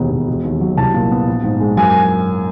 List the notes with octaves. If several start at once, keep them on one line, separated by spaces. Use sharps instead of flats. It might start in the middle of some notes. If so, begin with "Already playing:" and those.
Already playing: E1 D#2 B3
E1
E1
D#2
F#3
C2 A5
A#2
B3
A#1
G#2
G#3
F#2 G#5
G#5